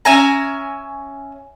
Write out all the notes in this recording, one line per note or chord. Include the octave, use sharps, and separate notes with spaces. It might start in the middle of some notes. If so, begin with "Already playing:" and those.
C#4 E5 G#5 A#5